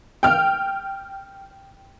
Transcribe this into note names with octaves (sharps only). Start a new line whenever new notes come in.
G5 F6